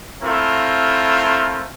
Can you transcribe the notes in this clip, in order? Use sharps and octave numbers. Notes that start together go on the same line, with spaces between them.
A3 C4 E4 F4 A#4